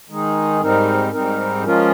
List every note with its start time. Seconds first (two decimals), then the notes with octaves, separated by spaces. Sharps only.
0.09 D#3 G#3 D#4 G#4
0.60 G#2 G3 C4 D#4 A#4
1.13 G#2 G3 C4 D#4 A#4
1.64 F3 G#3 C#4 F4 A#4